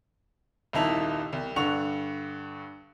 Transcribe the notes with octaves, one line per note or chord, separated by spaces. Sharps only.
D#1 C2 D#4 E4 A5 F7
C2
G2 D3 F#5 C#6 F7